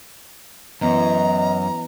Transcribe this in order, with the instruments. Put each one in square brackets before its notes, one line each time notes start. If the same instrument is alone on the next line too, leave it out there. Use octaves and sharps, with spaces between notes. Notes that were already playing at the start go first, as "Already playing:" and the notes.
[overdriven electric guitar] F#2 [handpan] E3 B3 [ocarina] D#5 [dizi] A#5